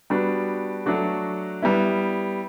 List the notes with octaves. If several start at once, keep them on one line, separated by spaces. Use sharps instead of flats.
G3 B3 D4 F#4
F#3 A3 D4 F#4
G3 B3 E4